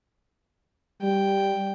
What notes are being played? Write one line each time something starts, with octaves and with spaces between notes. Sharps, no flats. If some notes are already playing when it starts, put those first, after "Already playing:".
G3 G5